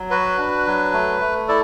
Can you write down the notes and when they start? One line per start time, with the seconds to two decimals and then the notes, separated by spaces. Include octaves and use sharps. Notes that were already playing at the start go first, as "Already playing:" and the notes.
Already playing: F#3
0.10 F#4 B4
0.38 D4
0.66 F#3
0.93 A3
1.21 A3
1.48 E4 A4 D5